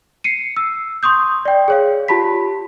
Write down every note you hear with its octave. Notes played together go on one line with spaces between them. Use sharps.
C7 C#7 D#7
E6
C6 C#6 D#6 G6
D5 G5
G#4 C#5 F5
F4 G4 A5 B5 B6